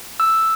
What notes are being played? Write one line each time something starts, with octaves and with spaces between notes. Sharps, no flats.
E6